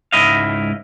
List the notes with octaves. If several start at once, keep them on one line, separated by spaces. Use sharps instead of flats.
C#2 G#2 E4 D#5 F5